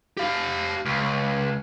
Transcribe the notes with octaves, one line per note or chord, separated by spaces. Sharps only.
G4 F5
C#2